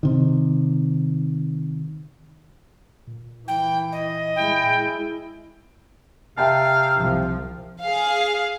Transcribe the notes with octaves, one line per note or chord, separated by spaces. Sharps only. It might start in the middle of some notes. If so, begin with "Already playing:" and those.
C3 D#3
A#2
E3 G5
D#5
G#3 E4 G5
C3 E5 F5 G5 A5
C2 F3
G#4 F5